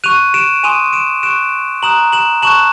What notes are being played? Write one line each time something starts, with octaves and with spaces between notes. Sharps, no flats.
C#6 F#6 D#7 F7
D7 E7
G#5 C6 D#6 D#7 F7
D7 E7
C#6 F#6 D7 E7
A#5 D#6 F#6 E7 F#7
E7 F#7
A5 C#6 F#6 E7 F#7